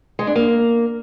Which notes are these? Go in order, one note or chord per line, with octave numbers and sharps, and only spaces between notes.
G#3
D4
A#3